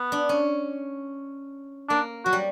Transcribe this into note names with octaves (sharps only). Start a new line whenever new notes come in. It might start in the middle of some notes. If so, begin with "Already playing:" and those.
Already playing: B3
D4
C#4
A#3 D4
F#3 F#4
G3